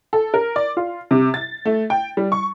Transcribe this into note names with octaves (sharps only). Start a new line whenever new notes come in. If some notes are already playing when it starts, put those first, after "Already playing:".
A4
A#4
D5
F4
C3
A6
A3
G5
G3
C#6